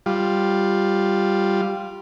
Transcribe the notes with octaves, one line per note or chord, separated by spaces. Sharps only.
G3 F4